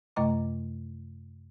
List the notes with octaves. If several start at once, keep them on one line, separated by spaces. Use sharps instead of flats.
F#2 C3 A3 D#5 A#5 D6